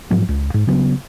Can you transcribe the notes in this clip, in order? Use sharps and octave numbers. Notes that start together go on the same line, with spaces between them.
G#2 F3 F#3
C#2
G#2
C#3 F#3 B3